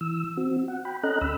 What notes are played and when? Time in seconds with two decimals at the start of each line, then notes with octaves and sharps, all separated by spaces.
0.01 E3 E6
0.37 C4 F#4
0.68 F#5
0.85 G5 B5
1.03 C#4 A4 D#5 A#5 F#6
1.21 D2 B5 E6